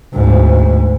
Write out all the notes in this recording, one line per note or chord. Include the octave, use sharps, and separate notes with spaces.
D2 G#2